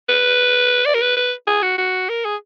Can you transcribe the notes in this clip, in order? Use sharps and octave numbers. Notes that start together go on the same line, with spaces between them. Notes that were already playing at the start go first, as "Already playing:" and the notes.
B4
D5
A#4
B4
B4
G#4
F#4
F#4
A#4
G#4